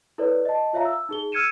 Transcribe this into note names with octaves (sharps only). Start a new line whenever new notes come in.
E4 A4 B4 C#5 D5
D#5 A5
F4 C#5 E5 F5 A#5
E6
D#4 G#4 G7
E6 F6 G#6 C#7 D#7 E7